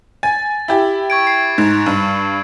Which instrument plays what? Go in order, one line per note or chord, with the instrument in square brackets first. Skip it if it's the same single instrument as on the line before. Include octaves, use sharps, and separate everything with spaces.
[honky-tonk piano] G#5 [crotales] A6
[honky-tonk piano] E4 G4
[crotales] C#6 G#6 D7
C7
[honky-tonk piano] G#2
G2